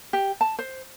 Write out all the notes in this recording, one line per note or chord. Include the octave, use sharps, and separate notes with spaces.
G4
A5
C5